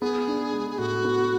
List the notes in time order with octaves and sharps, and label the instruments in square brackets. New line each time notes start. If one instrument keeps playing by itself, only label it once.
[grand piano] B3 [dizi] G#4
[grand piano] D4
G#3
[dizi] G#4
[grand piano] A2 [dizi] F#4
[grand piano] B3